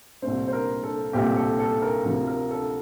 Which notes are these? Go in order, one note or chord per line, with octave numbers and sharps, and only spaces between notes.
C2 A#2 A3 C4 C5
C5
A#4
A4
C2 A#2 A3 C4 G4
A4
A4
A#4
D2 C3 F3 A#4
A#4
A4